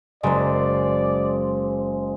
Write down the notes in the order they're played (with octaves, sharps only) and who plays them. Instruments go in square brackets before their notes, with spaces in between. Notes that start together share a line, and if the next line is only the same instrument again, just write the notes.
[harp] F#1 [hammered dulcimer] G#3 C5 [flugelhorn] D5